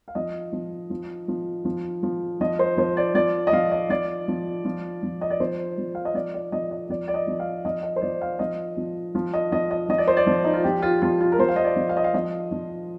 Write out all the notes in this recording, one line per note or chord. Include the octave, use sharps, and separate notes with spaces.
F5
F3 D#5
F3
F3
F3
F3
F3
F3 D#5
C5
F3 C5
D5
F3 D5
D#5
F3 F5
D#5
F3 D5
F3
F3
F3
D#5
D5
F3 C5
F3
F5
D#5
F3 D5
D5
F3 D#5
D#5
F3 D5
D5
D#5
F3
F5
F3 D#5
D#5
C5
F3 D5
F5
F3 D#5
F3
F3
D#5
F3 D#5
D#5
F3 D#5
D5
C5
D5
F3
D#4
F4
F3 G4
F4
F3 F4
F4
A#4
F3 C5
F5
D#5
D5
F3
F5
D#5
F5
F3 D#5
F3